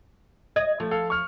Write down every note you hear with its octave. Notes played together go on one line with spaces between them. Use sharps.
D#5 G#6
F3 A3
A4 F5
C#6 F6